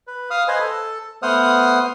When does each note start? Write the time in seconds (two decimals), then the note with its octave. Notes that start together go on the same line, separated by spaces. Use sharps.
0.07 B4
0.30 F5 D#6 F6
0.48 B4 C5 D#5 G#5
0.60 A4
1.23 A3 B3 C5 F#5 D#6 F6